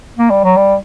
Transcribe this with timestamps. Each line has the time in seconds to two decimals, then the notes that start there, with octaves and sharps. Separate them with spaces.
0.18 A#3
0.31 G3
0.44 F#3
0.57 G3